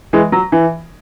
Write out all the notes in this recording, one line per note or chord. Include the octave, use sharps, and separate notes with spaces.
E3 G#3
F#3
E3